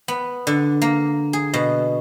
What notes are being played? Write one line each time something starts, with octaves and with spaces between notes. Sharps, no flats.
B3
D3
A#3
G#4
B2